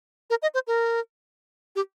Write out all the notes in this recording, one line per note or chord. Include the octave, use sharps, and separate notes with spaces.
A#4
D#5
C5
A#4
G4